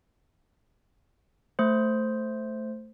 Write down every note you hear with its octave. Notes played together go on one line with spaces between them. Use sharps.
A3 C5